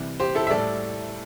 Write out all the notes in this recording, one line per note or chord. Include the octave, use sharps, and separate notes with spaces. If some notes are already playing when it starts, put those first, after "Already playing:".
Already playing: C3 E3 G3
G4 C5
E4 A4
E5
A2 G3 A4 D5